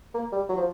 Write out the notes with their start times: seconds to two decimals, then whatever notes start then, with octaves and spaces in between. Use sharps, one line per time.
0.15 A#3
0.32 G3
0.49 F#3
0.58 F3